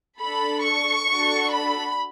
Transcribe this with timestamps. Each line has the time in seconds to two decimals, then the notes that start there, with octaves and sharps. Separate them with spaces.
0.20 D4 A4 B5
0.64 C#6
1.08 D4 F#4 A4
1.53 B5